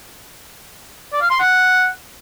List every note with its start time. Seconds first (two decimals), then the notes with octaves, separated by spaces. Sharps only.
1.12 D5
1.21 F5
1.30 C6
1.40 F#5